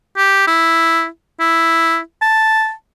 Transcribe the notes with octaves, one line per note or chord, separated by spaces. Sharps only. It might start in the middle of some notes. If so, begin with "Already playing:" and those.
G4
E4
E4
A5